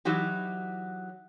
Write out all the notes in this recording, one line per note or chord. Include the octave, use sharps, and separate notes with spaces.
E3 F#3 D#4 F#4 G4